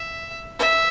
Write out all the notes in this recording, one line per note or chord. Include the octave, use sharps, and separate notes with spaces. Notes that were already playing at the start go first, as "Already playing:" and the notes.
Already playing: E5
E5